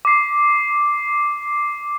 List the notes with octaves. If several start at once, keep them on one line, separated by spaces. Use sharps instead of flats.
D6 C7